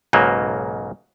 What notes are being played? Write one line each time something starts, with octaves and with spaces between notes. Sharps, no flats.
B1 G#2 C#3 F#3 A#3